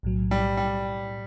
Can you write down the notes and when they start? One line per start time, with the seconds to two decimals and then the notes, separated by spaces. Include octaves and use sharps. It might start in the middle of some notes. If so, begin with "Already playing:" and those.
0.03 B1 A2 F#3
0.31 G3
0.57 G3